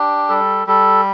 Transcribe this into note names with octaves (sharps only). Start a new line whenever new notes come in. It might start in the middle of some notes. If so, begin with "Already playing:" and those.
Already playing: D4 G4
G3 A4
G3 A4